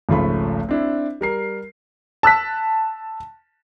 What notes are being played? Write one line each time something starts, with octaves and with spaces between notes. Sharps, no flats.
G#1 C#2 F3 A3 C#4 B5
C4 D4 E4
G3 A#4 C7
A5 E6 F#6 B6